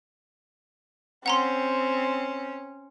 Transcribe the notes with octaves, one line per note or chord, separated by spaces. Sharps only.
C4 C#4 F#5 A#5 C6